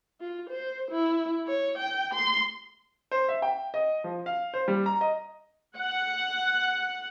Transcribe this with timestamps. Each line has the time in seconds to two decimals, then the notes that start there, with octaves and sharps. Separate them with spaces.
0.20 F4
0.50 C5
0.91 E4
1.47 C#5
1.78 G5
2.14 C6
3.11 C5
3.28 E5
3.42 G5
3.74 D#5
4.04 F3
4.26 F5
4.54 C5
4.68 G3
4.86 A#5
5.01 D#5
5.77 F#5